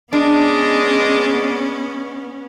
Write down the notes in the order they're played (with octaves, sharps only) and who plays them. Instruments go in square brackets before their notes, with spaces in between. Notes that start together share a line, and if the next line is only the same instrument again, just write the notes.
[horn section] G#3 D5 D#5 [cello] B3 C#4 [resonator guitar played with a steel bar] D4